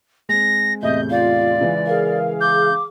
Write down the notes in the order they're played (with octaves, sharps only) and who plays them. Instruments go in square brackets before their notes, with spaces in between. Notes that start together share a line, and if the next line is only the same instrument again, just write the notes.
[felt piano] G#3 C4 [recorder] A#6
[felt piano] E2 A2 C3 [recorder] D#5 [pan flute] E5 [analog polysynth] G6
[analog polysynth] F4 [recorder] D5 [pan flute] F5
[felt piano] C#3 E3 G#3
[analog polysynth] G#4 F5 [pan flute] A#4
[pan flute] D6 [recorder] G6